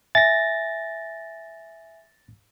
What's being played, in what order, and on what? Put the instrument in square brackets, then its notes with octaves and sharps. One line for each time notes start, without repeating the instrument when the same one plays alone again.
[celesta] E5 G#5 [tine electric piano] A6 A#6